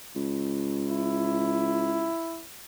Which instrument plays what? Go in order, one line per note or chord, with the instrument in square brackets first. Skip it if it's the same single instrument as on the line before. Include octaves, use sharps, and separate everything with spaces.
[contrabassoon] C#2
[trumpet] E4